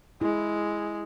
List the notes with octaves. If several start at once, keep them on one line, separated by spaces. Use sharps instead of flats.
G#3 E4